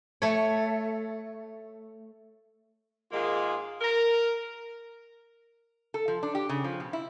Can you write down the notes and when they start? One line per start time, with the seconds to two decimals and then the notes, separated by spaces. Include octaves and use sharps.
0.22 A3 C#5
3.11 G#2 D#3 G#3 A#3 F4 G#4
3.81 A#4
5.94 A4
6.08 F3
6.23 D4
6.35 G4
6.49 C#3
6.64 F3
6.80 B2
6.93 E4